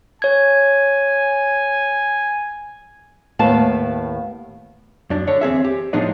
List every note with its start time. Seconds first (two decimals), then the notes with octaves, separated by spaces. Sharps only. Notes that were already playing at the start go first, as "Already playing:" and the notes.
0.22 C#5 G#5 G#6
3.39 D#2 A2 B3 F5 A5
5.10 F#2 D4
5.27 D3 D4 C#5
5.41 E2 C4 G#4 E5
5.64 G4
5.93 A2 F3 G#3 B3 D4 D#4